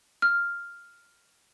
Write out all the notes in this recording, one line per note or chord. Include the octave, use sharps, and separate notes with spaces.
F6